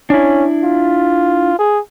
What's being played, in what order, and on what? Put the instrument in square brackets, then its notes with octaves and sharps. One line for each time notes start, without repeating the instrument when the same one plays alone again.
[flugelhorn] C#4 [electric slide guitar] D4 E4
[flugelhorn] F4
G#4